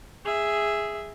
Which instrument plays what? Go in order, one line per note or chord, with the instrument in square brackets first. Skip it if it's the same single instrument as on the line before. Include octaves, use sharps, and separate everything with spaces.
[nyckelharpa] G#4 E5